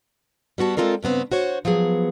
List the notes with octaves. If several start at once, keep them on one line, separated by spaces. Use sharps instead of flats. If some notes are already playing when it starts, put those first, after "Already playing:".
G3 B3 F#4 A5
G#3 C4 F4 A4 A#4 D5
G2 C#3 B3 C4
F#4 C5 C#5
F3 F#3 B3 G#4